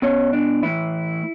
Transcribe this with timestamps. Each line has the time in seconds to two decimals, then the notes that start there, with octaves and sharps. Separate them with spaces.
0.02 B2 C#4
0.33 D4
0.63 A2 E3 E4